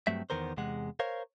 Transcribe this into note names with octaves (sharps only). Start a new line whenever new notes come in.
G2 F#3 A3 C4 E5
E2 D#3 B3 A#4 C5
E2 C3 G#3 F#5
A#4 C5 C#5 F5